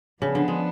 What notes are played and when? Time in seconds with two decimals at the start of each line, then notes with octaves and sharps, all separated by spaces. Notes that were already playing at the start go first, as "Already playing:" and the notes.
0.22 C#3 F3 B3 D4
0.35 D3
0.48 G#3